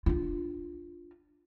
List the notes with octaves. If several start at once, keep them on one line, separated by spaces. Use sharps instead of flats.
D4 F4